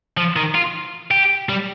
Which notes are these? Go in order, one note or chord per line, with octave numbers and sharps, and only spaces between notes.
F3
D#3
F4
G4
G3